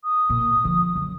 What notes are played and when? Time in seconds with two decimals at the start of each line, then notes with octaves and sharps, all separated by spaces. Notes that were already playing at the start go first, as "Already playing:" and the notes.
0.04 D#6
0.30 A#2
0.65 D3 F3
0.96 F#2